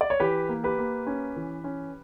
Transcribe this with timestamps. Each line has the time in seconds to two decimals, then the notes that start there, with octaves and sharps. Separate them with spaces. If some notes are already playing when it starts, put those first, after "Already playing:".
0.01 D5
0.10 C#5
0.20 E3 G4 B4
0.49 A#3
0.64 G4 B4
0.79 A#3
1.07 C#4
1.36 E3
1.64 C#4